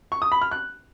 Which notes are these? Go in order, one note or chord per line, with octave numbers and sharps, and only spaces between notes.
C#6
D#6
B5
F6
F#6